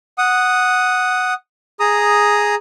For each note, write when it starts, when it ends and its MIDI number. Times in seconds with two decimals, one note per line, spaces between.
0.18 1.34 78
0.18 1.34 87
1.80 2.55 68
1.80 2.55 82
1.80 2.55 87